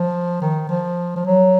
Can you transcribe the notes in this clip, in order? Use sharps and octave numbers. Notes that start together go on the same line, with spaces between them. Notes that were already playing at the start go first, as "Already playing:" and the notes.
Already playing: F3
D#3
F3
F3
F#3